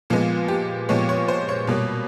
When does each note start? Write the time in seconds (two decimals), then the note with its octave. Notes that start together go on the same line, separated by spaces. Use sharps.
0.10 A#2 F3 G#3 B3
0.48 G4
0.89 A#2 F3 G#3 B3 C#5
1.09 C#5
1.28 C5
1.49 C#5
1.67 B2 G3 A#3